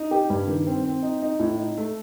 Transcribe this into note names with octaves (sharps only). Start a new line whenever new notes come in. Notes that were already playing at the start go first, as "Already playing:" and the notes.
Already playing: D#4
G4
G2
D#3
C4
C4
D#4
D#4
A2
D#4
A3